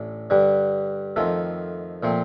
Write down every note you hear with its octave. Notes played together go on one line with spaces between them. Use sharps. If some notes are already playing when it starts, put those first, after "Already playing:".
Already playing: A1 A2 D4
G2 D3 G3
F2 D#3 A3 F4 A4
A#2 F3 A3 C4